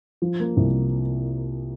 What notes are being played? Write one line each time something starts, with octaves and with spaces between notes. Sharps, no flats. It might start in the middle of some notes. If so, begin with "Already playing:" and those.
F3
A#3
C2